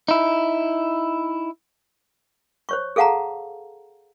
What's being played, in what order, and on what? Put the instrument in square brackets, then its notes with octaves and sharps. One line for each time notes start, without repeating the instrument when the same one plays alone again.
[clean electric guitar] D#4 E4
[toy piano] C5 C#5 C#6
G#4 A4 F5 F#5 A5 A#5